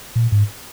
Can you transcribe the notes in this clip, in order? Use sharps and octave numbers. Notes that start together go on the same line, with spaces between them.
A#2
G#2